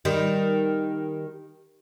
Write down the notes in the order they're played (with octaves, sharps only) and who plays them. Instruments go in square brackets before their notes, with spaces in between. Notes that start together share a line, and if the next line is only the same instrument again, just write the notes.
[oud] D#3 G3